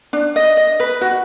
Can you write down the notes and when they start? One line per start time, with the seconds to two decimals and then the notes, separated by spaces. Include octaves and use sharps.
0.13 D4
0.36 D#5
0.57 D#5
0.80 B4
1.01 F#4